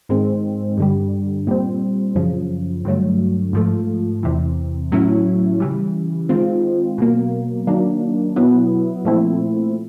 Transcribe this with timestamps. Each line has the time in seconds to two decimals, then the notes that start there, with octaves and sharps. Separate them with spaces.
0.09 G#2 D#3 G#3 C4
0.78 G2 D3 G3
1.47 A#2 G3 C4
2.15 F#2 C#3 F3
2.85 G2 D3 F#3 A3
3.53 G#2 F3 A3
4.23 E2 C3 E3
4.92 A2 F#3 A3 C#4 E4
5.60 C#3 E3 G3
6.29 D#3 G#3 C4 F4
6.98 B2 F#3 A#3
7.67 D#3 F#3 A#3 D4
8.36 B2 F#3 B3 E4
9.05 A#2 F3 A3 C4 E4